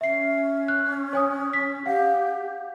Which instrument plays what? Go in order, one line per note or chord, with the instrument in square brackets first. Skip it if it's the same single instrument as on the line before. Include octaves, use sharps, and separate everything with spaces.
[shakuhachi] C#4 [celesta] E5 C7
[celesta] F#6
C#5 G#5 D#6
B6
[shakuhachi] G4 [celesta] F5 F#5